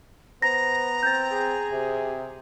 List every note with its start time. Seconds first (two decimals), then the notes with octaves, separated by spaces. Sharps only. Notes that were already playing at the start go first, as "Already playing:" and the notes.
0.42 B3 C5 A#5 A#6
1.03 C4 G6 A6
1.32 G#4
1.71 C3